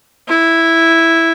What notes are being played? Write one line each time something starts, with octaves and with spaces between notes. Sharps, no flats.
E4